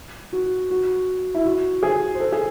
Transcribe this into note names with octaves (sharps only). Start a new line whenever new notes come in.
F#4
F#4
E4
F#4
G#4
C5
A4
G#4